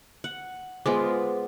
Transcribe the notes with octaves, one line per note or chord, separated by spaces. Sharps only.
F#5
G#3 B3 F4 G#4 C5 D6